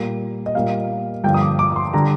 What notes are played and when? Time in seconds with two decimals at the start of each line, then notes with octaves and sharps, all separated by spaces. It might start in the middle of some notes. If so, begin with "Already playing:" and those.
Already playing: A#2 G3 A#3
0.46 D#5
0.55 A#2 G3 A#3 F5
1.24 G2 D3 F3 G5
1.34 D#6
1.42 D6
1.59 D6
1.72 D6
1.76 C6
1.93 D3 G3 A#5